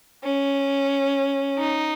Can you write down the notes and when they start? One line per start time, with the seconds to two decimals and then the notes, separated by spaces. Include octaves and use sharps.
0.24 C#4
1.58 D#4